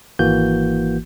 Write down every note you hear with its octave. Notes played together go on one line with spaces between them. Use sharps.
G#1 E3 A#3 F#4 G6